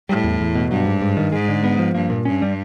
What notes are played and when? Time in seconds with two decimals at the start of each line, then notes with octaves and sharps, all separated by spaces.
0.09 A2 G3
0.24 E2
0.40 E2
0.55 B2
0.70 G2 F#3
0.86 G#2
1.01 G#2
1.17 D#3
1.32 G#2 G#3
1.48 D3
1.64 B3
1.79 F3
1.95 G2 A#3
2.10 A#2
2.25 G2 C#4
2.42 G3